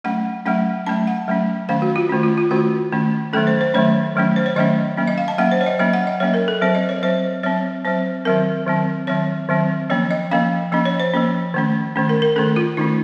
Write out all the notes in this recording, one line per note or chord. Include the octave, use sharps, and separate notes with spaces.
F#3 A3 C#4 F#5
F#3 A3 C#4 F#5
F#3 A3 C#4 A5
F#5
F#3 A3 C#4
D#3 A3 C#4 F5
F#4
F4
D#3 A3 C#4
F4
F4
D#3 A3 C#4 F#4
D#3 A3 C#4
D#3 F#3 A3 C#4 A4
C5
C5
D#3 F#3 A3 C#4 C#5
D#3 F#3 A3 C#4
C5
C#5
D#3 F#3 A3 C#4 D#5
F#3 A#3 C#4
D#5
F5
A5
F#3 A#3 C#4 F#5
C5
C#5
D#5
F#3 A#3 C#4 D#5
F#5
D#5
F#3 A#3 C#4 C#5
A#4
A4
F#3 C4 C5
D#5
C#5
F#3 C4 C5
F#3 C4 C#5
F#3 C4 C5
D#3 F#3 C4 A#4
D#3 F#3 C4
D#3 F#3 C4 C#5
D#3 F#3 C4
F3 A#3 C#4 C#5
D#5
F3 A#3 C#4 F5
F3 A#3 C#4 D#5
C#5
C5
F3 A#3 C#4
D#3 A3 C#4
D#3 A3 C#4
A#4
A#4
D#3 A3 C#4 A4
F4
D#3 A3 C#4 D#4